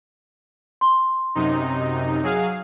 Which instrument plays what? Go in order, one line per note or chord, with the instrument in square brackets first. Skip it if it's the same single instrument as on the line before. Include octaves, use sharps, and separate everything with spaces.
[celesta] C6
[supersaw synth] F#2 C3 D#4
F#3 G#4 F5